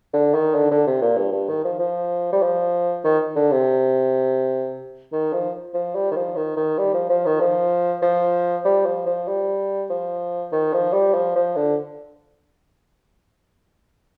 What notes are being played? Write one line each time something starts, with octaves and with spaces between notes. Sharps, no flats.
D3
D#3
D3
D3
C3
A#2
G2
G2
D#3
F3
F3
G3
F3
D#3
D3
C3
D#3
F3
F3
G3
D#3
F3
D#3
D#3
G3
F3
F3
D#3
F3
F3
G3
F3
F3
G3
F3
D#3
F3
G3
F3
F3
D3